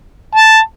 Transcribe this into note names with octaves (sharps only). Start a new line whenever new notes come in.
A5